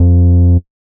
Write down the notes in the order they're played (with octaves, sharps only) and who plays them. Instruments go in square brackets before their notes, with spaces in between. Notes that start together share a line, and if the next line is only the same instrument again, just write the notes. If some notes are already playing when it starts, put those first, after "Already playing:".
Already playing: [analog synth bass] F2